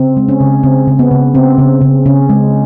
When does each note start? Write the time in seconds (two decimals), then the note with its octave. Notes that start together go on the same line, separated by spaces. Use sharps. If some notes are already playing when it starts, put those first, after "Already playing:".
Already playing: C#3 C4
0.17 G#3
0.28 C#4
0.41 C#3
0.63 C#3 C4
0.88 C#3
0.99 B3
1.11 C#3
1.35 C#3 C4
1.58 C#3
1.81 C#3
2.06 C#3 C#4
2.30 G#3